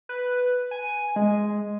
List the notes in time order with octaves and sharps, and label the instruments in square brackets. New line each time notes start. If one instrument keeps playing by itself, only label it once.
[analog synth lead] B4
G#5
G#3